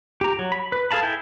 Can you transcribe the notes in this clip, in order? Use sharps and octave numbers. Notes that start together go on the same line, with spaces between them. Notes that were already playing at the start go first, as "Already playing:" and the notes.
G4 A#5
F#3
B5
B4
G#4 A4 F5 A5 B5
E4 G5 G#5